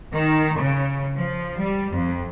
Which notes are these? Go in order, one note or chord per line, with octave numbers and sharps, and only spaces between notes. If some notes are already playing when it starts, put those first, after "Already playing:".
D#3
C#3
F3
G3
F2